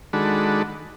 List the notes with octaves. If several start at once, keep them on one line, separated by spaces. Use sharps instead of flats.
D#3 G#3 D4 F#4 A4 B5